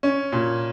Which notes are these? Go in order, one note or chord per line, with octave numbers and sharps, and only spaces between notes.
C#4
A#2